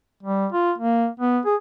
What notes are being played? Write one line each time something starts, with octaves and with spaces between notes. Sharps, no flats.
G3
F4
A#3
B3
G#4